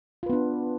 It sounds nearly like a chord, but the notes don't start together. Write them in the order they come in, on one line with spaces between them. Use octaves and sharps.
F4 B4 B3 D4